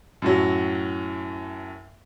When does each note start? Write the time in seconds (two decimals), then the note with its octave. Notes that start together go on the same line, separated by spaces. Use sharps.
0.22 F#2 A2 F#3